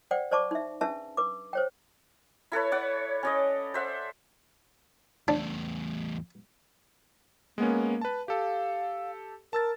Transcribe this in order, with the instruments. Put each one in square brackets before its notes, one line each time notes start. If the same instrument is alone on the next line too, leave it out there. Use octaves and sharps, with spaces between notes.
[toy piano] C5 D5 F#5 G5
C5 D5 A5 C#6 D6
D#4 E5
C#4 D4 G#4 B4 E5 A5
B4 D6
C5 C#5 G5
[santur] E4 A4 B4 C#5
C#5 D5 F#5
C#4 D5 D#5
C5 E5 F#5
[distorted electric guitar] E2 A2 [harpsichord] D4
[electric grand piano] G#3 B3 C#4 [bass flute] A#3
[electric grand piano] B4 A5
[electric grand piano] G4 A4 [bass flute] F5
[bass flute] A#4 [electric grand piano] A5 E6 A6